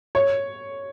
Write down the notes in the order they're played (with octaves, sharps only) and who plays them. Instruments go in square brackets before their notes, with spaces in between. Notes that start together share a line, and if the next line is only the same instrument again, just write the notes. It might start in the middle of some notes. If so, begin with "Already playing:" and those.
[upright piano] C#5